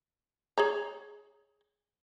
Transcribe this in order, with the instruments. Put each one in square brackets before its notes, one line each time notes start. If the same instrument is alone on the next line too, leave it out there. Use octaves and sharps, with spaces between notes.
[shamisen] G#4 C#5 A#5